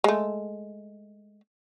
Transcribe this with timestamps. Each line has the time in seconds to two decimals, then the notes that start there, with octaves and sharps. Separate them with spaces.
0.04 G#3 A3